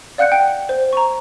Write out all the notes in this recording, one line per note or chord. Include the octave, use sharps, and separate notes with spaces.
D5 F5 F#5 F#6 G6 C#7
G5
C5
A#5 C#6